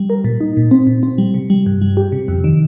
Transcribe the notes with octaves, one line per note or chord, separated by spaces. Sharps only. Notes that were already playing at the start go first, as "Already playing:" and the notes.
Already playing: G3
A#4
A#2
D#4
A#2
C4
A#2
C4
G3
C3
G3
G2
G3
G4
C3
F2
D#3